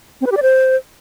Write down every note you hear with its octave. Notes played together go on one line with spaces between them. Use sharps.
C4
B4
G4
D5
C5